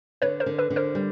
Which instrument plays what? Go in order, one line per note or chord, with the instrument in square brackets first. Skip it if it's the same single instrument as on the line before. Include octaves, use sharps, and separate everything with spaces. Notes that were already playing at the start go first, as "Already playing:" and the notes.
[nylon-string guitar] D3 [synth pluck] B4 C#5
[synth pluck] A#4 C5
[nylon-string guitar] D3
[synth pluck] A4 B4
[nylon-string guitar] D3
[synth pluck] A#4 C5
[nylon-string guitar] G3